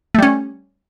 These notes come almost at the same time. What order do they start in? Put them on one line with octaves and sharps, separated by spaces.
A3 G3 C#4